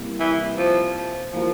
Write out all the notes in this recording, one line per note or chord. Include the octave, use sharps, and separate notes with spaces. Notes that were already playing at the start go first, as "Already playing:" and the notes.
Already playing: C3 G3 A#3 E4 G4
E3
F3
E3 F3 A#3 F4 A#4